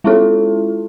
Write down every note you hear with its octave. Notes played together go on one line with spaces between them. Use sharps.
G#3 C#4 E4 F4 A4